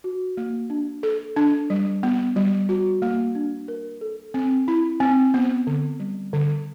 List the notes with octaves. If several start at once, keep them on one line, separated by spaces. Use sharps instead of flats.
F#4
A#3
D4
A4
D4
G3
B3
G3
F#4
A#3
D4
A#4
A4
C4
E4
C4
B3
D3
G3
D3